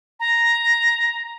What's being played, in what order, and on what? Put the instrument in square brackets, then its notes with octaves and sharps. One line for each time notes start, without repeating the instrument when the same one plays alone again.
[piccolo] A#5